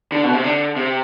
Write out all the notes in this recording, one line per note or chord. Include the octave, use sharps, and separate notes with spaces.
D3
B2
C3
D3
C3